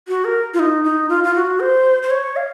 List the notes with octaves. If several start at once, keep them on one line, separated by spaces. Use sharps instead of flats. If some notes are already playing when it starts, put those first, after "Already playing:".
F#4
A#4
F4
D#4
D#4
F4
F4
F#4
C5
C5
C#5
F5